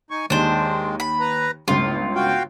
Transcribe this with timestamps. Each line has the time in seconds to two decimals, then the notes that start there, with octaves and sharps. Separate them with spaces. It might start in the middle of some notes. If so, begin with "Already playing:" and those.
0.11 D#4 G#5 C#6
0.30 D#2 D#3 G#3 D4 C5
1.00 B5
1.20 B4 A#5
1.68 G1 C#2 A2 F4
2.15 F#4 F5 G5